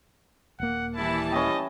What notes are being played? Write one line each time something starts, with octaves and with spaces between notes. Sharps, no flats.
D#1 A#3 F#5
E3 G3 E4 A5
C#4 E4 D#5 G5